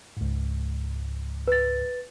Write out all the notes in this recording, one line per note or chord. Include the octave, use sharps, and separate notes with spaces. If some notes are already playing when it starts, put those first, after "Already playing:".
C#2 G#2
B4 A6